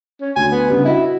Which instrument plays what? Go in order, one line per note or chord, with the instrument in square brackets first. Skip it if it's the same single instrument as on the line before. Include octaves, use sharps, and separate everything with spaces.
[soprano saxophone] C#4
[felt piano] D2 [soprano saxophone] G#5
[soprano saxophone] B3
[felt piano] C#3 G3 D4
[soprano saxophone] E4 [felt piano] F#4 D#5